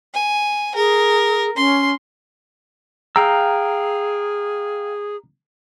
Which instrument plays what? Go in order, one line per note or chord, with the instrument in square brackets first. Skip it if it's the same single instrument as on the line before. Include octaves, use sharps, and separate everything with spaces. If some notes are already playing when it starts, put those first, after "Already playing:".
[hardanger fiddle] G#5
[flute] G#4 [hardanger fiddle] A#4
[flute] C#4 [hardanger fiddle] C6
[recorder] G#4 [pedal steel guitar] F5 G5 E6 [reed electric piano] A#5